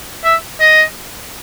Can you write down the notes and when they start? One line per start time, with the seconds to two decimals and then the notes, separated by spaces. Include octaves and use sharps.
0.24 E5
0.60 D#5